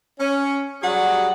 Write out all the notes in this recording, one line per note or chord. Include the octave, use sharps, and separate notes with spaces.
C#4
F#3 G3 G#4 F#5